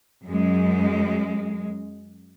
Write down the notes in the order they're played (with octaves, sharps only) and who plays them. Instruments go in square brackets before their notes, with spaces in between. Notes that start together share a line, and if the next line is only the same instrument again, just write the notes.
[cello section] F#2 G#3